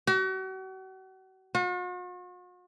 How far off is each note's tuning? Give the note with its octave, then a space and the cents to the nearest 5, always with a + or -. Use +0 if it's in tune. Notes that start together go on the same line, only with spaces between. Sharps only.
F#4 +40
F#4 -45